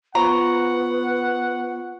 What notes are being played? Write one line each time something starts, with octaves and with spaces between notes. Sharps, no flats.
B3 F4 C5 F#5 A#5 C#6